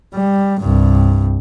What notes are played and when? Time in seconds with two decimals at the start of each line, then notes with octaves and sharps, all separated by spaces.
0.14 G3
0.60 C2 G2